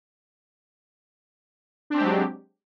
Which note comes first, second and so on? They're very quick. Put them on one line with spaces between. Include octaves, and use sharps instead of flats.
D4 C4 G4 G#3 F#3